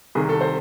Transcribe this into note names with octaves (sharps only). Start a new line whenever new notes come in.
C2 C3 D#3 G#4
A4
C5